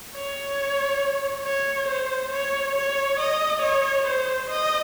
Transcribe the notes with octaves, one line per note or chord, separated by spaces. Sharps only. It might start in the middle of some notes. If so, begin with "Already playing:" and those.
C#5
C#5
C5
C#5
C#5
D#5
C#5
C5
D#5